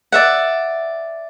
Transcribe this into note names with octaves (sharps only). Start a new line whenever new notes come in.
D5 E5 F#5